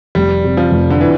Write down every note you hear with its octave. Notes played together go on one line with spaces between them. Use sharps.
F1 G3
C3
F3
F1
D3
E3 E4